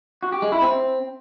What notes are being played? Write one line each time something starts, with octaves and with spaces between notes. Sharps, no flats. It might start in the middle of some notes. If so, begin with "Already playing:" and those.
F#4
G4
G#3
E4
C4